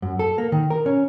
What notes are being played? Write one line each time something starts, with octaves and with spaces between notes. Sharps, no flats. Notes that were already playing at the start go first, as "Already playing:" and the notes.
F#2
A4
A#3
D#3
A#4
C#4